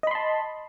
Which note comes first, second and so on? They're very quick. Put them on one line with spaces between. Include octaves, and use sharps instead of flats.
D#5 B5 C6 A5